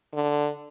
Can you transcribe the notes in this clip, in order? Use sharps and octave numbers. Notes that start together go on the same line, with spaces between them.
D3